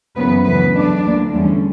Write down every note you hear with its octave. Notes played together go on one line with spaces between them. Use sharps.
F#2 C#3 E3 A#3 B3 B4
D2 C#3 E3 B3 B4
E2 D3 F#3 D4 D5
D2 D3 A#3 D4
E2 D3 G3 C#4